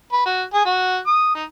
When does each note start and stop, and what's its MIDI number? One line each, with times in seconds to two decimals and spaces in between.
0.13 0.24 71
0.26 0.43 66
0.54 0.64 68
0.66 0.99 66
1.07 1.32 87
1.35 1.44 63